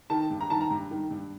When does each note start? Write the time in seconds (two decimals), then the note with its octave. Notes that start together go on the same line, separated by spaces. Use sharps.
0.10 D#3 A5
0.30 G2
0.41 A#5
0.50 D#3 A5
0.61 A#5
0.70 G2
0.91 D#3
1.11 G2